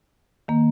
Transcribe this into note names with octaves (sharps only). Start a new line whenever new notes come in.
D#3 A#3